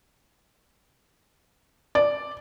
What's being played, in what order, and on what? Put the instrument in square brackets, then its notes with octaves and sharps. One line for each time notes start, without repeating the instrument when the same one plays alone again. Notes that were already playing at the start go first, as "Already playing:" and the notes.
[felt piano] D5